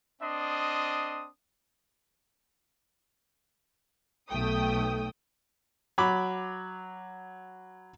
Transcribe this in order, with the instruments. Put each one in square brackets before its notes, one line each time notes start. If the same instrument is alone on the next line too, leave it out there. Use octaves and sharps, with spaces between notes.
[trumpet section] C4 D4 D#5 C6 D#6
[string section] B1 A3 G5 D#6
[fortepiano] F#3 B5 D6